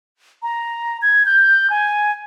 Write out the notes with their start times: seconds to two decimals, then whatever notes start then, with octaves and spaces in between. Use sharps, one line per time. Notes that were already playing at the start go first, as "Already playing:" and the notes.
0.43 A#5
1.02 G#6
1.26 G6
1.70 G#5